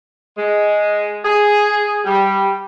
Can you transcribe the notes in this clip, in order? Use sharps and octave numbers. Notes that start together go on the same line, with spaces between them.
G#3
G#4
G3